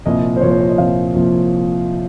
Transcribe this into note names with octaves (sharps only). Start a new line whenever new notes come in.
C2 A#2 F3 D#5
C5
C2 A#2 F3 C#5
C5
C#5
D#5
C2 A#2 F3 F5
C2 A#2 F3